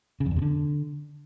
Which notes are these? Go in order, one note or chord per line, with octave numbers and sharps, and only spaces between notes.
C#3
F2
E2
C3
D3